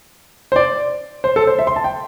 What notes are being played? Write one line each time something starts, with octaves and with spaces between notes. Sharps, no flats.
C5
D5
C5
A4
C5
E5
C6
A5
G5